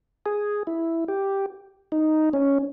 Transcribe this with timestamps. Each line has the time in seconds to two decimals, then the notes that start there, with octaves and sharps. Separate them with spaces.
0.26 G#4
0.67 E4
1.08 G4
1.92 D#4
2.33 C#4